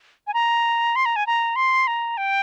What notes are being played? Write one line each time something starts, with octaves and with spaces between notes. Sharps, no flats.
G#5
A#5
C6
A#5
G#5
A#5
C6
A#5
G5